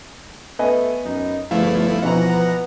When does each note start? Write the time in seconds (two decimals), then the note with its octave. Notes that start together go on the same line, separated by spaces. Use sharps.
0.59 A3 B3 D#5 G#5
1.05 F#2 D#4
1.51 G1 E2 F3 A3 E4 F5
2.02 B2 E3 F3 F#4 F#5 A#5
2.32 B3